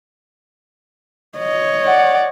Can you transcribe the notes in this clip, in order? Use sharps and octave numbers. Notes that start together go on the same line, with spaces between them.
C#5 D#5
D5 F#5